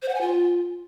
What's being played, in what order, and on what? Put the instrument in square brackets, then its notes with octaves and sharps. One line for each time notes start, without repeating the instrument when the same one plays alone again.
[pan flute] C5
F#5
G#5
F4